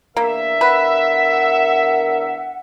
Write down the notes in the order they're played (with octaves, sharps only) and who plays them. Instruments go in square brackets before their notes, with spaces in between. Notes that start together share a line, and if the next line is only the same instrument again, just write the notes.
[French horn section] E2 D4 A#4 [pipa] A#3 [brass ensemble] E5
[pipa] B4 [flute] F#5